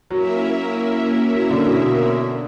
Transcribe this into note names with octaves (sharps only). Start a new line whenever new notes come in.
F#3 A#3 C#4 E4 A#4 E5
F#3
D3
B2
B2